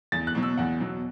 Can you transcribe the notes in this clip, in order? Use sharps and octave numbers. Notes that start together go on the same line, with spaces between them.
E2 A6
F#6
B2 F#3
E6
E2 F#5
B2 F#3